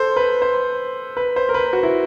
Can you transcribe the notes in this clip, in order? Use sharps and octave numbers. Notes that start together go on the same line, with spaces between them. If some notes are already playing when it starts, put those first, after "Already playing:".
Already playing: A4 C5
B4
C5
B4
C5
A#4
B4
F#4
E4